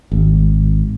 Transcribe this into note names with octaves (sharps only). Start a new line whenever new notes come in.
G#1